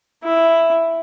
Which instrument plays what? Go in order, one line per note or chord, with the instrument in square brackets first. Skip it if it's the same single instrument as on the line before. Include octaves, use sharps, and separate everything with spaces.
[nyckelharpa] E4